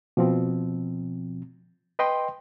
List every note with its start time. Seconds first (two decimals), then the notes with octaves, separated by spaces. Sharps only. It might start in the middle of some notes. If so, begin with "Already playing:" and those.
0.17 B2 F3 C4
1.99 B4 D#5 G5 C6